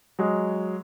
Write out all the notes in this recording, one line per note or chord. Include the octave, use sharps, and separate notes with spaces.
F#3 G#3